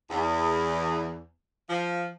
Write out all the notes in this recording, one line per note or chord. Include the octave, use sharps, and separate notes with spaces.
E2
F3